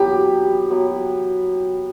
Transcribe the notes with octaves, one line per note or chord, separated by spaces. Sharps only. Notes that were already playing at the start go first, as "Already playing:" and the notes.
Already playing: F#3 B3 E4 G4
F#3 B3 E4